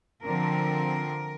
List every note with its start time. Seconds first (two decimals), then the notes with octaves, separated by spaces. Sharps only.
0.24 D3 F3 C4 A#4